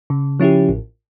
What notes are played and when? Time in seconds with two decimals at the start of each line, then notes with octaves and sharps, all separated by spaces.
0.10 C#3
0.40 F3 C#4 E4 G4
0.69 A1